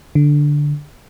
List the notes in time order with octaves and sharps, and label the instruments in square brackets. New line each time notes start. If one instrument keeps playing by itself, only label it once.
[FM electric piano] D3